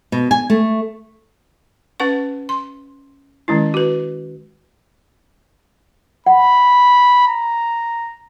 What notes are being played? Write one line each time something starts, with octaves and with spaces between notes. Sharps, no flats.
B2
G#5
A3
C#4 B4 F#5 C#6
C6
D#3 G#3 C#4 E4
F#4 B4
F#5 B5
A#5